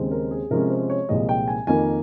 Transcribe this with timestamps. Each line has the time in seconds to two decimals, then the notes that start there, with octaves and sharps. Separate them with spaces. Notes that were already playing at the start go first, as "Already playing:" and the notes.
Already playing: D#2 C#3 G#3 C4
0.11 A#4
0.31 G#4
0.51 C3 F3 G#3 C#4 A#4
0.70 C5
0.90 C#5
1.09 C2 A#2 F3 G#3 D#5
1.29 G5
1.48 G#5
1.67 F2 D#3 A#3 G#5